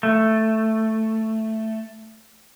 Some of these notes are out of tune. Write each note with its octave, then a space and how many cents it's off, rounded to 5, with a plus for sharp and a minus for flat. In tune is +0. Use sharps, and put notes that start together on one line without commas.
A3 +5